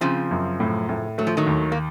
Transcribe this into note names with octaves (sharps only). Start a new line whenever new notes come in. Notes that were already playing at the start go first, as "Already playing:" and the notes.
C#3 F3 C4
F#2
A2
A2
F#3 A3
F3
D#3 F#3
D#2
A#3